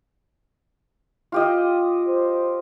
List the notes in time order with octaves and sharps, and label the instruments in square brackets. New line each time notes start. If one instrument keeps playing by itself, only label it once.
[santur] F4 G4 D#5
[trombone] C5